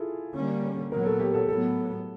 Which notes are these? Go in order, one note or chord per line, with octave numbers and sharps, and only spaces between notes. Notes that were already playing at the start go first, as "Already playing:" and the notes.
Already playing: E4 F4 G#4 A4
D3 G3 A#3 C#4
A#2 F#3 B3 A#4
A4
G4
A4
A2 F#3 B3 A4